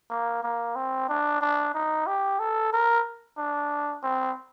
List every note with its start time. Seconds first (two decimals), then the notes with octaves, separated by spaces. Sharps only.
0.10 A#3
0.43 A#3
0.76 C4
1.09 D4
1.41 D4
1.75 D#4
2.07 G4
2.39 A4
2.73 A#4
3.38 D4
4.03 C4